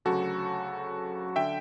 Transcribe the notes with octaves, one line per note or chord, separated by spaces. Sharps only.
D2 C#3 F#3 F#4 A4
D3 E5 G5